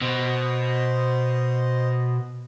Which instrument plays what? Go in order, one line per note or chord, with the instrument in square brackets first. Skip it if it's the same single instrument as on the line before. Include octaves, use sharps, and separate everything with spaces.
[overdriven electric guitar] B2 [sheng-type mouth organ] C5 D#5